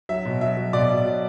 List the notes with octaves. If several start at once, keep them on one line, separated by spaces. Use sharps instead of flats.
F#3 E5
B2
F#3 E5
F#3
B2 D5
B2
F#3